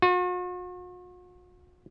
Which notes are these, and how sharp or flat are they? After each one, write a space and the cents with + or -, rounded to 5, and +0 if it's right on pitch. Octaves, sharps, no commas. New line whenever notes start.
F#4 -45